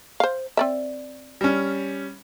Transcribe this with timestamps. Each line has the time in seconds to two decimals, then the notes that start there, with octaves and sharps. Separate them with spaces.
0.20 C5 F5
0.57 C4 D5 E5
1.41 G3 C#4